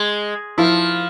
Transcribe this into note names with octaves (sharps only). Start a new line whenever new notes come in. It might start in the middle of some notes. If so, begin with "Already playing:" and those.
Already playing: G#3
F3 E4